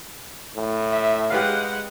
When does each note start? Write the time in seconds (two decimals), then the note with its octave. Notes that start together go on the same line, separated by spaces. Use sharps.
0.56 A2
0.91 E5
1.30 G#3 G4 B4 F5 F#5